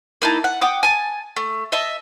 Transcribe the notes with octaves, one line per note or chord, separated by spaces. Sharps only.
A#3 D#4 E4 A5
F#5
F#5 G5 D6 D#6
G#5 A5
A3
D#5 E5 A5